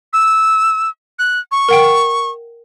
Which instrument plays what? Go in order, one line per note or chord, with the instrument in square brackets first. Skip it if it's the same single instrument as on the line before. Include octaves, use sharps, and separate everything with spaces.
[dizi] E6
F#6
C#6
[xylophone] A#4 F#5 G5